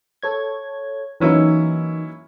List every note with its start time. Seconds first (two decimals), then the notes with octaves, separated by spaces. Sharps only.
0.23 A4 C#5 G#6
1.20 E3 F#3 A#3 C#4 D#4 E4